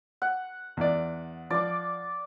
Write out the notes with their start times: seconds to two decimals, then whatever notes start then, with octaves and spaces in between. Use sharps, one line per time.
0.22 F#5
0.77 E2 D5
1.50 F3 D5 D6